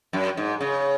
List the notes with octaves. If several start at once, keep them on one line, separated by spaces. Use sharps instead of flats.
F#2
G#2
C#3